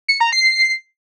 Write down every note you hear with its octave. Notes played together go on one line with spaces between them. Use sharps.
C#7
A#5
C7